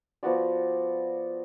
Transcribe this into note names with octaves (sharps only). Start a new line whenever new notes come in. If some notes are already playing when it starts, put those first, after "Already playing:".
F3 B3 F#4 D5